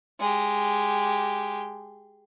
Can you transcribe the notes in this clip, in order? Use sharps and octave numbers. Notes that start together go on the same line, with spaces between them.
G#3 G4